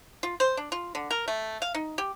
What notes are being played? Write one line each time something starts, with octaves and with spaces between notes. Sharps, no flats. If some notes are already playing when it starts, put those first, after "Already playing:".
F4
C5
D4
F4
D3
A#4
A3
F5
D#4
G4